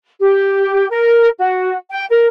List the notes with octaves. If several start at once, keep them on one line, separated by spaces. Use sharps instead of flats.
G4
A#4
F#4
G5
A#4